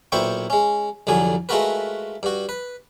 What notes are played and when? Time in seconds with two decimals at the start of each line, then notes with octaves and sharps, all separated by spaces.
0.12 B1 A#2 E4 C5 G5 C#6
0.50 G#3 C#4
1.07 C2 F2 D3 F#3 G#5
1.49 G#3 A3 F4 F#4 A#4 B4
2.23 G2 F#4
2.49 B4